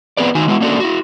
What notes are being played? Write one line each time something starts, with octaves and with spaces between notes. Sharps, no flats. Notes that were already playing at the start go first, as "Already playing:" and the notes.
B3 C4 G#4 B4 D5
D#3 D#4 F#4 G#5
G#3 B3 E4 F#4
A#3 C#4 D4 F#4 A4
E4 F#4